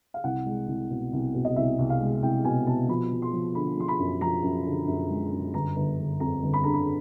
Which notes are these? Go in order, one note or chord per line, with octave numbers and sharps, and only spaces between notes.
F5
C2 F#5
G#3
C2
B2
C2
B2
D#5
C2 E5
C2
F5
G#3
C2 G5
B2 G#5
B2 A5
F3 B5
F3
C6
F3
D3 B5
F3 C6
B5
F#2
F3 A#5
F#2
D3
F#2
G#3
F#2
G1 A#5
G1
G1
F2 A#5
G1
B5
D3 A#5
B5